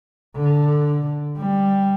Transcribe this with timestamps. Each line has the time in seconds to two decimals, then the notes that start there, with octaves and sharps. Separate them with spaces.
0.37 D3
1.39 G3